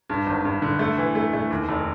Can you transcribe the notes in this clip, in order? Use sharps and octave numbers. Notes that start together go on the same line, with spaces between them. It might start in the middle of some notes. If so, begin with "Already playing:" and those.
G2
G#1
G2
D3
A3
E3
A3
A3
D#2
F1